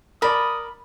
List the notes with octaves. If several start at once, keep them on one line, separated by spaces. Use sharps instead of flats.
A#4 D5 B5 D#6